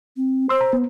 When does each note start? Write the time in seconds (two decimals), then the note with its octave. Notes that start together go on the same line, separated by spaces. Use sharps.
0.17 C4
0.49 C5 C6 E6
0.61 A#5
0.73 B3